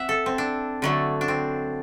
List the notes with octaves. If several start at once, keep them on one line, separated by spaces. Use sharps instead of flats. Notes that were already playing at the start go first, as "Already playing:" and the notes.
Already playing: C4 E5 F#5
A4
C4
D4
D3 F#3 A3
D4
C4